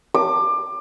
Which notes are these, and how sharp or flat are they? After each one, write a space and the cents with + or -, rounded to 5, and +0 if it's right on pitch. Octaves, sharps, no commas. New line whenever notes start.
D6 +25